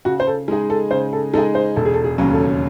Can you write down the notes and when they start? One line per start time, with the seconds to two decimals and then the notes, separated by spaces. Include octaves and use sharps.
0.05 C#3 F#4
0.20 C5
0.27 A4
0.48 G#3 D#4 G#4
0.70 A4
0.91 C#3 C5
1.13 A4
1.34 G#3 D#4 G#4 A4
1.55 C5
1.76 E1 A4
1.85 G#4
1.94 A4
2.04 G#4
2.18 D#2 C#3 F#3 C#4
2.33 A4